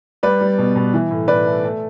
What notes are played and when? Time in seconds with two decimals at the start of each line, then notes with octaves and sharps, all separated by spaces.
0.23 G3 B4 D5
0.41 G3
0.58 B2
0.75 B2
0.94 E3
1.11 A2
1.28 A2 B4 D5
1.46 A3
1.64 A3